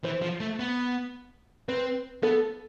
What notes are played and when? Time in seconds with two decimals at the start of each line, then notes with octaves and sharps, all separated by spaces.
0.04 E3 C5
0.22 F3
0.40 A3
0.59 B3
1.68 C4 B4
2.23 B3 A4